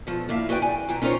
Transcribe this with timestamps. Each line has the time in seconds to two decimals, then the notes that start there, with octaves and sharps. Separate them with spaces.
0.07 B2 F3 A3
0.29 A2 A#3 E4 E5 F5
0.49 F#4 G#4 B4 D5 G5
0.62 G#5
0.88 B2 E3 C4 E4 G5 A#5
1.02 C#4 D#4 F4 A#4 C5 C#5